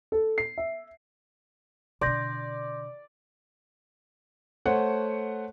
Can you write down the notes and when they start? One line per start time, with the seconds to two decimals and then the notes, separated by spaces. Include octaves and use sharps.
0.12 A4
0.38 C7
0.58 E5
2.01 B2 D3 D5 C6 G6 A#6
4.66 A3 C5 C#5 F#5